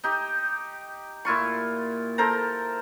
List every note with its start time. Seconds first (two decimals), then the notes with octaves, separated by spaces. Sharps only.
0.04 D#4 G4
1.25 A#2 E4 F4 C#6
2.18 A4 A#4 C5 A#5